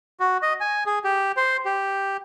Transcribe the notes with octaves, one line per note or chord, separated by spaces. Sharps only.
F#4
D#5
G#5
G#4
G4
C5
G4